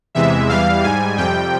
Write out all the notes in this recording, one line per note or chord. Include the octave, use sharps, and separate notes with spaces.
E2 C3 E3 G#3 E5
E2 E3 G3 F5
G#2 G3 G#5
F2 C3 G3 G5